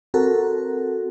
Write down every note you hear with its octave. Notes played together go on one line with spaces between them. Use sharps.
C4 F#4 A4 A#4